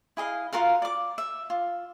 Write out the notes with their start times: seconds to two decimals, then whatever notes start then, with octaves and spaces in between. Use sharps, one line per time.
0.17 E4 G#4 D#5 F5
0.53 F4 F#4 A#4 F5
0.82 D5 D6
1.18 E5
1.50 F4